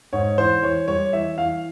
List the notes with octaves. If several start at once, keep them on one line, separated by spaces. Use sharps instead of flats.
G#2 C#5
E3 C5
E3 C#5
G3 C#5
E3 E5
E3 F5